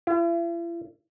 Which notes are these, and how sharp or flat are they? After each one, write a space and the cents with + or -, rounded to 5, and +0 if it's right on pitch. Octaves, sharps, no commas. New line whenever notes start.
E4 +45